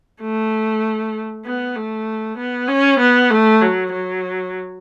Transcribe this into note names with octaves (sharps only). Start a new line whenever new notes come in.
A3
B3
A3
B3
C#4
B3
A3
F#3
F#3